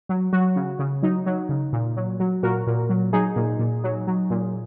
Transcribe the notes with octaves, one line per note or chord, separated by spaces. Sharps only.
F#3
F#3 F#4
C#3
C#3
F#3 D#4
F#3
C#3
A#2
F#3
F#3
A#2 F#4 A#4
A#2
F#3
F#3 D#4 G#4
A#2
A#2
F#3
F#3
A#2